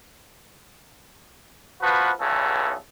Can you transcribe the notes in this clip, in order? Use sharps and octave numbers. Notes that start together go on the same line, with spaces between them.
F3 F#4 B4
B1 E2 C#3 A4